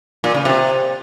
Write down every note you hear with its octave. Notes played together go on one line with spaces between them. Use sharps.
A#2
C#3
C3